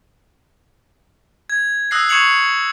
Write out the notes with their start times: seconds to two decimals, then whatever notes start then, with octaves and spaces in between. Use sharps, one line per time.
1.50 G#6
1.91 D#6 E6 F#6 A#6 C7
2.09 C#6 G#6 C7 C#7 F7 F#7